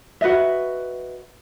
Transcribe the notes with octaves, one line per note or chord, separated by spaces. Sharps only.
F#4 B4 D#5 E5